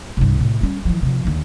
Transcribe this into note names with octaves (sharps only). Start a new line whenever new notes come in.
C2 G2
A2 C3
G3 C#4
E3 F3
C3 F3
D#2 D3